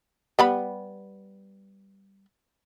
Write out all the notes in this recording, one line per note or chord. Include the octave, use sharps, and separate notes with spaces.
G3 B3 B5